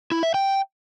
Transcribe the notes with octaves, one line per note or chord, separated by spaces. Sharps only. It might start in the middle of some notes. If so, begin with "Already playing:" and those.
E4
E5
G5